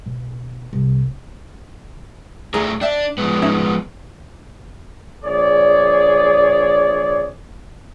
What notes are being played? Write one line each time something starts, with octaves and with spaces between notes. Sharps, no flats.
B2
C2
D2 A3 E4 G#4 A#4 A#5
D4 E5 G5
F3 G#3 B3
C#4 D#4 E4
A#1 G#4 C#5 D5